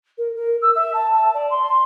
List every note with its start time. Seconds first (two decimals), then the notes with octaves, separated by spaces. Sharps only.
0.18 A#4
0.35 A#4
0.61 E6
0.75 E5
0.93 A5
1.13 A5
1.34 D5
1.50 C6